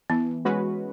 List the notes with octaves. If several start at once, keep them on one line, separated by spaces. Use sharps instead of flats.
E3 B3
G#3 C#4 F#4 B4